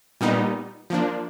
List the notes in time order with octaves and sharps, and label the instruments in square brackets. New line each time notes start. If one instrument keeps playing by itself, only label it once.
[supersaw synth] A#2 G3 B3 D#4
F3 A#3 D4